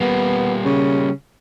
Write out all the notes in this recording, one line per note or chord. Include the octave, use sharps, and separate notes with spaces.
G3 A#3 B3
C#3